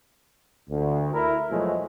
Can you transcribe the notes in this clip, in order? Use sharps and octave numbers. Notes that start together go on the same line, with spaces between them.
D2
E4 A#4
E2 B2 F3 F#3 G#3 A3